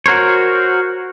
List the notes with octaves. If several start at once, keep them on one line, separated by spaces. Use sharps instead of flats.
F#4 A#4 C5 C#5